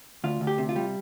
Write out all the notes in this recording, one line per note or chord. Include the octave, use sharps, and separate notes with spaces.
D2 F4
D2
G4
C3
F4
G3